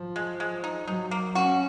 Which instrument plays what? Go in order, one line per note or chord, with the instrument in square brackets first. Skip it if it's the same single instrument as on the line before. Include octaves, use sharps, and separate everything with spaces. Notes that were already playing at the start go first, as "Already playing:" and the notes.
Already playing: [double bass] F3
[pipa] G#3
G#3
D#4
[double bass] F#3 [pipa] D#4
[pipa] A#3
[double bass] C#4 [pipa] F#4